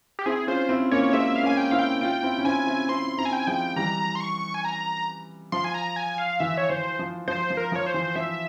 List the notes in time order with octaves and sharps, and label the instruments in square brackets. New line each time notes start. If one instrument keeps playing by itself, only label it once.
[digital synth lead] G4
[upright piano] C4 E4 [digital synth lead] G#4
[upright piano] C#4 F4 [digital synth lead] C5
[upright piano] C4 E4
[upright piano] A#3 C#4 [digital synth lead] C#5
[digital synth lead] C#5
[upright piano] G#3 C4 [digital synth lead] E5
[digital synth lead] F5
[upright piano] A#3 C#4 [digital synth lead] G#5
[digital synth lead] G5
[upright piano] C4 E4 [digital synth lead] F5
[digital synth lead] G5
[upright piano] C#4 F4 [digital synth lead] G5
[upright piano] C4 E4
C#4
[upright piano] C4 E4 [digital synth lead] G#5
[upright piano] C4 E4
[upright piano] C4 E4 [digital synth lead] C6
[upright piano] C4 E4 [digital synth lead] A#5
[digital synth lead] G#5
G5
G#5
[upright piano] F3 G#3 [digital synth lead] G5
[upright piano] E3 G3 [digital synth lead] A#5
[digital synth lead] C6
C#6
G#5
A#5
[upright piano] F3 [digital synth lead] C6
[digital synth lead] G#5
A#5
G#5
F5
[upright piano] E3 [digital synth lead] E5
[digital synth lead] C#5
[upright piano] E3 [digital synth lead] C5
[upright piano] F3
[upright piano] F3 [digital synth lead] C5
[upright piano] F3
[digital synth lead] A#4
[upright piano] F3
[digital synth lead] C#5
C5
[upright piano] E3
[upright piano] F3 [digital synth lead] E5